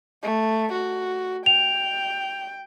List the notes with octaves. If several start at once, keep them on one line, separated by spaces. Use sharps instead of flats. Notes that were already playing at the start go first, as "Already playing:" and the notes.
A3
F#4
G5 F7